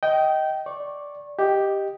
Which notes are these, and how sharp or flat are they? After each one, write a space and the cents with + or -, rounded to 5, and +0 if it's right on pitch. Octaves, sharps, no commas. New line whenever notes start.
D#5 +10 G5 -20
D5 -10 C#6 -25
G4 +0 D#5 +0